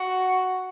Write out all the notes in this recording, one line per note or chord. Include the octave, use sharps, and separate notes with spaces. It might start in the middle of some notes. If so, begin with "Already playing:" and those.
Already playing: F#4